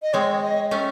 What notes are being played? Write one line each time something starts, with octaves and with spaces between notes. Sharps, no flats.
D#5
G#3 C4 C#5
D#5
A3 C#4